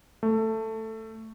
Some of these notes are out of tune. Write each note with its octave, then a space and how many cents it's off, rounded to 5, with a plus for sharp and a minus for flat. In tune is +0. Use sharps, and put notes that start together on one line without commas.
A3 +10